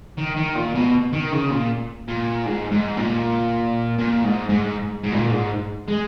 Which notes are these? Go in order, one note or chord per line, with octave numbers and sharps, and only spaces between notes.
D#3
D#3
A#2
B2
D#3
C#3
A#2
A#2
G#2
G#2
A#2
A#2
G#2
G#2
G#2
A#2
G#2
G#3